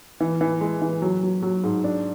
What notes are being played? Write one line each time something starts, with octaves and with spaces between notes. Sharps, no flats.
E3
E3
G#3
E3
F#3
F#3
F#3
G#2
D4